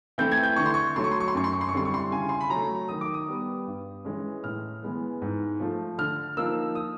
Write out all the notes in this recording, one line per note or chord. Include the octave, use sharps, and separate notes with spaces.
E3 A3 C4 E4 G6
G#6
G6
D3 C#6
C6
C#6
F#3 A3 C6
C#6
C6
C#6
C6
F#2 C#6
C6
C#6
C6
C#6
D3 G3 C4 E4 C6
C#6
C6
C#3 G#5
C6
B5
F#3 A3 A#5
D#3 D#6
D6
D#6
G3 B3
G2
E3 G#3 C#4
A2 F6
E3 G#3 B3
G#2
F3 A3
D3 F6
F3 A#3 D#4 E6
D#6